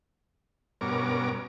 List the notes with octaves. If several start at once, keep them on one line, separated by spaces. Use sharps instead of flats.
G2 B2 C#4 A#4 D6